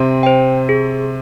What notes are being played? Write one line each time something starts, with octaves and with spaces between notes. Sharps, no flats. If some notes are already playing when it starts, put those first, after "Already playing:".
Already playing: C3 C4
C5 G5
G#4